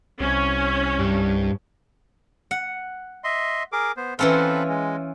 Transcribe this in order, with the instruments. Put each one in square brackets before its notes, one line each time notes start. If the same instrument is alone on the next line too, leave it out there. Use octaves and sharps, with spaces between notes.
[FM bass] C2 [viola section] C#4
[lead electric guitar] G2
[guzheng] F#5
[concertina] D#5 E5 C6
G#4 A#4 D6
B3 C5
[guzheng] E3 C#4 F4 [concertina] C4 A4 B4
[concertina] G#3